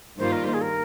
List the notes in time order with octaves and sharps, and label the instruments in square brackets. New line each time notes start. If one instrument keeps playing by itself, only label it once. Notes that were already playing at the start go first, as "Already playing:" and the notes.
[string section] G2 D#3 G3 A#3 F4 [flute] C5
[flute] A#4
C5
G#4
A#4